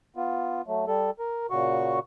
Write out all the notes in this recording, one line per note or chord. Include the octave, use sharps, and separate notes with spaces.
B3 F4
F#3 A3
G3 A4
A#4
A#2 C#3 F#4 C#6